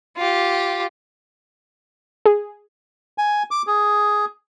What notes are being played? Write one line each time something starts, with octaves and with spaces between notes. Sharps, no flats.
F4 G4
G#4
G#5
D6
G#4